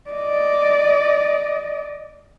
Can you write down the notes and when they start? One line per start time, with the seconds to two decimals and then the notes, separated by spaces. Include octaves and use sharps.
0.10 D5 D#5